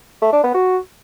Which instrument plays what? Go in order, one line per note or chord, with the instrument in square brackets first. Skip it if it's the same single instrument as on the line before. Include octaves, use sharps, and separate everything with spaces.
[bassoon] A3
D4
B3
F#4